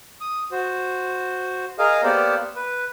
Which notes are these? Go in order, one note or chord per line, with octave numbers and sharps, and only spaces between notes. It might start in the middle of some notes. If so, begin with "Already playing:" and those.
D#6
F#4 C5
G#4 A#4 D#5 F5
A#3 B3 G4 C5 D5
B4